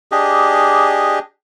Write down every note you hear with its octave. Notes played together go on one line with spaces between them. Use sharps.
D4 G4 G#4 D#5